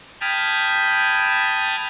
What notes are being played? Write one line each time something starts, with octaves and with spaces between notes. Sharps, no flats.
G5 A5 B5 D#6 F6 G#6